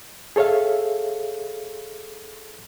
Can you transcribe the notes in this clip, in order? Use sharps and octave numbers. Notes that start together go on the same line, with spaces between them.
G#4 A4 C#5 E5 F5